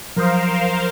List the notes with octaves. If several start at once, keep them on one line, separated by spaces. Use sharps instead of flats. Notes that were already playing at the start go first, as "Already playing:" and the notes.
F3 F#3 A#4 C5 F5 D#6